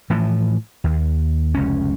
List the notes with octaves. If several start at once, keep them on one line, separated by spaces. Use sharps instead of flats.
A2 E3 F3
D#2
F1 C#2 C#4